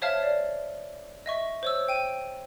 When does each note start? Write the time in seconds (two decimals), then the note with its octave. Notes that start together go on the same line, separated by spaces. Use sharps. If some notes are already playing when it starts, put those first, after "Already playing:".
0.02 C5 C#5 E5 F5 A5 F6
0.23 D5
1.26 D#5 E5 C#6
1.63 C5 C#5 E6
1.87 C5 G5 D#7